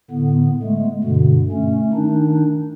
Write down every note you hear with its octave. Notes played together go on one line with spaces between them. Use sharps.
A2 D3 B3
G#3 A3
G2 B2 D3
A3 C#4
D#3 D4 D#4